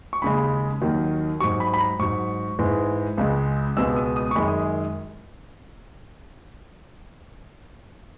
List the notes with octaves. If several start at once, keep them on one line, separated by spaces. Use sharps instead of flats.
C#6
D#2 C#3 G#3 B5
D#2 D#3 F#3
G#2 F#3 C#6
B5
B5
A#5
G#2 F#3 C#6
G#2 E3 G#3
C#2 C#3 G#3
C#2 B2 G#3 E6
D#6
D#6
C#6
F#2 D#3 G#3 B5
D#6